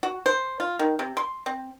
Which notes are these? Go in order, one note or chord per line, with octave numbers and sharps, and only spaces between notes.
F#4
C5
F4
D#3
C3
C6
C4